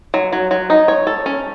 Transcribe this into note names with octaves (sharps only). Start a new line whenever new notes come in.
F#3
F#3
F#3
D#4
C#5
A4
C#4